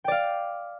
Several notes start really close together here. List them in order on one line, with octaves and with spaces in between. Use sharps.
G5 D5 F5